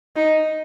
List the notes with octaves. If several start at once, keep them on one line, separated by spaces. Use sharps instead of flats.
D#4